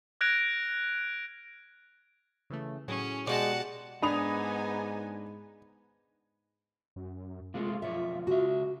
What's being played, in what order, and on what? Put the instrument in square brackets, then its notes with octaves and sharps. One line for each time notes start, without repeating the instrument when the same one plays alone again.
[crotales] F6 F#6 G#6 A#6 D7 F7
[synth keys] C#3 E3 A3
[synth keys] A2 F#3 G#4 [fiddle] C#4
[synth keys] B2 G4 F#6 [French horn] G#3 [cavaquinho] F#4 D5 [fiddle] F#5 A5
[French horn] G#2 [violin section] B3 D#4 G#5 [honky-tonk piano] D4 D#6 F7 [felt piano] B5
[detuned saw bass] F#2
[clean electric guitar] C3 G#3 A3 [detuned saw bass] F4
[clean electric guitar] B1 F2 C#5 [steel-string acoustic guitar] E5
[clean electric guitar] C#2 E5 [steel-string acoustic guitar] F#4